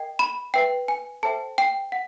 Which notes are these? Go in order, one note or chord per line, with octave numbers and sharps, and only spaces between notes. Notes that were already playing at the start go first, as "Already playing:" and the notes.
Already playing: A#4 D#5 G5
B5
B4 E5 G5
G#5
A4 C5 E5 G5 A5
G5
F#5